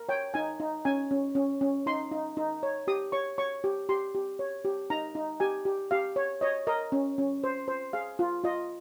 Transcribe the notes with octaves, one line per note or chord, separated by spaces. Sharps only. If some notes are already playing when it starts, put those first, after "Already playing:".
Already playing: A#4
C#5 G5
D#4 G#5
D#4
C#4 G#5
C#4
C#4
C#4
D#4 C6
D#4
D#4
C#5
G4 D#6
C#5 C#6
C#5 C#6
G4
G4 C6
G4
C#5
G4
D#4 A#5
D#4
G4 G#5
G4
G4 F5
C#5
C#5 D#5
A#4 D#5
C#4
C#4
C5
C5
G#4 F5
F4
F4 D#5